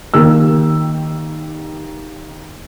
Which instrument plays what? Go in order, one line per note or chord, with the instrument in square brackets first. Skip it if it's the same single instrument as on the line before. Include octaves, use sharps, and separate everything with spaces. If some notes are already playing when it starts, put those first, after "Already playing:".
[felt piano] D#3 A#3 G4 E6